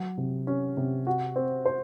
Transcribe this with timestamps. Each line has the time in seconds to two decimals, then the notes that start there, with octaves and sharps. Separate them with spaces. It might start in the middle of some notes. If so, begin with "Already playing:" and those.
Already playing: F#3
0.17 C3
0.47 C#4
0.77 C3
1.07 F#4
1.36 C4
1.66 C5